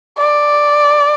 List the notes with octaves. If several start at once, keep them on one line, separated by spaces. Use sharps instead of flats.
D5